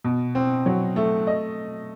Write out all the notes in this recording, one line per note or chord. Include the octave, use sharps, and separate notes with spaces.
B2
C4
F#3
A3
D#5